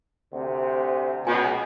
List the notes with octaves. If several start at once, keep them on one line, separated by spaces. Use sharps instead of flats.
D2 C3
C#2 B2 G#5